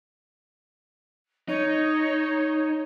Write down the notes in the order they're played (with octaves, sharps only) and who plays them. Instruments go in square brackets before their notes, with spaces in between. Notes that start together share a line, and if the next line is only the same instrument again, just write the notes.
[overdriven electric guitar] D#4 [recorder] C#5